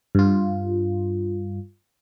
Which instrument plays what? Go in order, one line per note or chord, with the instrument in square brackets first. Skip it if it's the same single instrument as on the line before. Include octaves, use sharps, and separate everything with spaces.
[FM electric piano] G2 F4